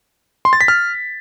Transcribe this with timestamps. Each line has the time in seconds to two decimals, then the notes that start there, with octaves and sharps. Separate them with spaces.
0.45 C6
0.53 A6
0.61 B6
0.68 F6